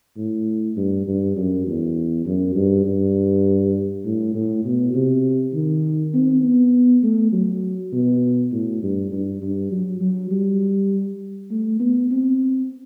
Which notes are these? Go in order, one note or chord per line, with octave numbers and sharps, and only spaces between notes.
A2
G2
G2
F#2
E2
F#2
G2
G2
A2
A2
B2
C3
D#3
C4
B3
A3
F#3
B2
A2
G2
G2
G2
F#3
F#3
G3
A3
B3
C4